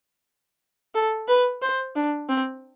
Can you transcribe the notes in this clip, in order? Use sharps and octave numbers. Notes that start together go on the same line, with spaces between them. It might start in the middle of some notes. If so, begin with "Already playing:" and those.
A4
B4
C5
D4
C4